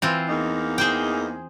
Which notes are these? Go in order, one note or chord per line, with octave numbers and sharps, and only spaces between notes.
E3 C4 F4
E2 A#3 D#4
G#4 C5 G5